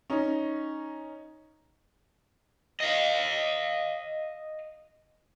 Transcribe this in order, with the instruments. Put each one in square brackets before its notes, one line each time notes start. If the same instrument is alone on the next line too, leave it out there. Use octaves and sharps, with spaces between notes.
[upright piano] C#4 D#4
[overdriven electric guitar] D#5 F5